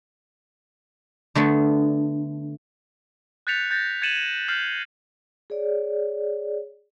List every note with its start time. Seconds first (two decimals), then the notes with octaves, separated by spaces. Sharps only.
1.35 D3 A3 B3 D4
3.47 F#6 G6 A6 B6 C#7 F7
3.71 G6 A6 A#6
4.02 G#6 A6 C#7 D#7 E7 F#7
4.48 F6 G6 A6 C7 F#7
5.50 G#4 C#5 D5